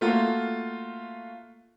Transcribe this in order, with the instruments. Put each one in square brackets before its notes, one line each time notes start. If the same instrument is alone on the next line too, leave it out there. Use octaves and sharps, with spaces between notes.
[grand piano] A3 A#3 F4 F#4